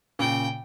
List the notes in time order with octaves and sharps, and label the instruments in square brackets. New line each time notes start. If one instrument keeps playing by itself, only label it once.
[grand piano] A#2 C#3 [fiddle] G5